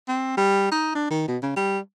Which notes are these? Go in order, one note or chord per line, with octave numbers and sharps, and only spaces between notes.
C4
G3
D#4
D4
D#3
B2
C#3
G3